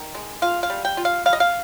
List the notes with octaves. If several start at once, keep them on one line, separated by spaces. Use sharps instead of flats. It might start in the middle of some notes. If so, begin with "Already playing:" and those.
Already playing: D#3
G#3
F4 F5
F5
G3
G5
F4
F5
G3 F5
D#5
F5